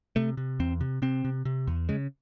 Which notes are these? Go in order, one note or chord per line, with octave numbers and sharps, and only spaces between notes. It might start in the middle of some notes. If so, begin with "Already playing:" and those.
C3 A3
C3
E2 C4
C3
C3 C4
C3
C3
E2
C#3 G#3